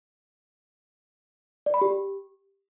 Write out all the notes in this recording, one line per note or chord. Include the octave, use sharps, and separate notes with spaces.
D5
B5
G4